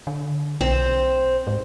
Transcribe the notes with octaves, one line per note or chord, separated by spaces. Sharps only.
D3
B1 C4 C5
G#2